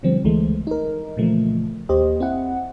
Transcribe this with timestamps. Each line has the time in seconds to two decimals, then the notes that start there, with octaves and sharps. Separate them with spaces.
0.03 B2 D3 F3 G3 C4
0.24 C#2 E3 G#3 A3
0.67 D#4 A#4
1.17 A#2 C#3 E3 F3 A3
1.89 D#2 A#3 G4 C5 D#5
2.20 C4 E4 F#5